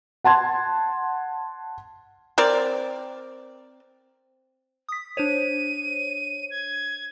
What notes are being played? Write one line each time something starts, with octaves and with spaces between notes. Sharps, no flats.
F#5 A5 C6 G#6
C4 A#4 D5
D#6 B6
D4 C5 C#5 D#7
G#6